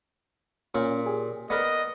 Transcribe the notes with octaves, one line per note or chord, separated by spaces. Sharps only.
A#2 C#4 F5
G4 G#4
B3 A#4 D5 D#5 D#6